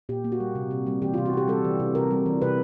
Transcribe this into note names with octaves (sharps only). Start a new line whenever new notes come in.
A#2 G4
A#3
F#4
G3
C3
C3
G3
E3 G4
F4
C3
F#4
C3 G4
G3 A4
E3
C3
C3 A#4
G3
E3
C3 B4